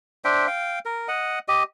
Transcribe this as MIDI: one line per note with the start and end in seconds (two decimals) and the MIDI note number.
0.25 0.47 62
0.25 0.47 72
0.25 0.47 76
0.25 0.47 79
0.47 0.79 77
0.47 0.79 79
0.85 1.08 70
1.08 1.39 75
1.08 1.39 78
1.48 1.63 67
1.48 1.63 75